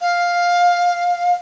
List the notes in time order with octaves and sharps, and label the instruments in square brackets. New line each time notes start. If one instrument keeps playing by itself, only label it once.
[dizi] F5